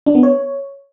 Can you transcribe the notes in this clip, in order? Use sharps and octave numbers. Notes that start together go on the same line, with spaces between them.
D4
B3
C#5